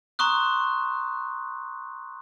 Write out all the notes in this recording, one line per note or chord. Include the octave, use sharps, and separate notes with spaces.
A#5 C6 C#6 D#6 F#6